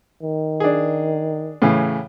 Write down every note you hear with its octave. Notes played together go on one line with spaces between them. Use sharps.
D#3
D4 G#4
A2 C#3 E3